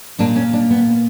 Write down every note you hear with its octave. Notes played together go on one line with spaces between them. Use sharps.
A#2 A#3 D4
C#4
D4
B3